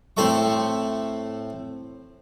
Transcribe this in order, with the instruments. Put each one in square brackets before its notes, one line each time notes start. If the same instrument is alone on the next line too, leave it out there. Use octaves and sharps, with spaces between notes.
[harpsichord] A2 C4 A4 E5 C#6